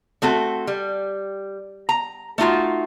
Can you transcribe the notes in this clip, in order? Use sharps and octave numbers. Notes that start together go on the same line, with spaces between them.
A3 C4 F#4 A4
G3
A#5
A3 D#4 F4 F#4